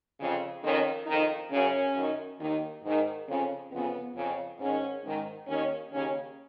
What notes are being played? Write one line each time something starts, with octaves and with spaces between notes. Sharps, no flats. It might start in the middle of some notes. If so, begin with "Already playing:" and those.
F2 C#3
F2 D#3 C#4
F2 D#3 D#4
F#2 C#3 C#4
F#2 D#3
D#2 D#3
G#2 D#3
F2 C#3 C#4
F2 C#3 B3
F2 C#3
G#2 D#3 C#4
G#2 D#3
D#2 D#3 C#4
D#2 C#3 C#4